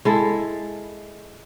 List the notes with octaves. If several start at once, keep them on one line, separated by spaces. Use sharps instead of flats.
G#3 E4 A4